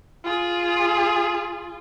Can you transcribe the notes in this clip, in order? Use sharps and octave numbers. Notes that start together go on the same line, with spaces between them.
F4 G#4